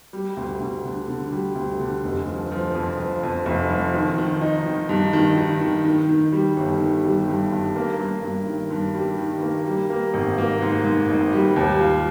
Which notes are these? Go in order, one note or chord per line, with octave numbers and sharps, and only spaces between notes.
G3
D2
D2
D3
D3
G3
D2
D3
F1
F3
F3
F2
F3
F2
F1
F3
D#3
D#3
D#4
D#3
G2
D#3
D#3
D#3
D#3
D#3
G3
G1
D#3
G3
G2
G2
A#3
G2
G2
D#3
G2
G3
D#3
A#3
G3
A#3
G#1
A#3
G#2
G#2
G#1
G3
D#2
F4